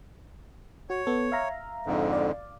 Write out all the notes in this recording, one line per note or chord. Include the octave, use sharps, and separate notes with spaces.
F#4 C#5
B3 A4
E5 F5 A#5
F2 G#2 D3
D5 F5